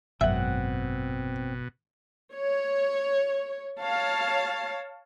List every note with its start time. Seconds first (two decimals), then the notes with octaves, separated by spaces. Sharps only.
0.21 G#1 F#2 B2 C4 E5 F#5
2.34 C#5
3.80 C#5 F5 A5